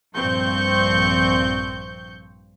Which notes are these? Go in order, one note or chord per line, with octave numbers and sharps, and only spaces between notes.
A#1 G2 F3 C4 C#6 G6